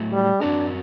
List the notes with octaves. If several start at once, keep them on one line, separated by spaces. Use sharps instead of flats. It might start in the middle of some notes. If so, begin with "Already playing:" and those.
Already playing: A2 F#3 A3
G3
F#2 F#3 C4 D4 F#4 A#4